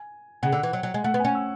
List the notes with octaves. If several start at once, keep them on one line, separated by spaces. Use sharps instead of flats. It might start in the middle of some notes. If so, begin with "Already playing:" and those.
Already playing: G#5
C#3 F#5
D3
E3
F#3
F#3
G#3
A3 F#5
B3
C#4 G#5
E6